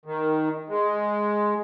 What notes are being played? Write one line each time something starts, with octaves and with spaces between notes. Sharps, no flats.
D#3
G#3